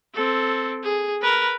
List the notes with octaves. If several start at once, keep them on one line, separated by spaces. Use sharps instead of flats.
C4 A4
G#4
A#4 B4